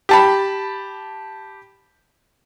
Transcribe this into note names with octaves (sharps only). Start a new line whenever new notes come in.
G4 A5 B5